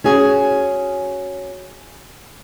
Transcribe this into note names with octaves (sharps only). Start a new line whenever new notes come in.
C#4 F#4 G#4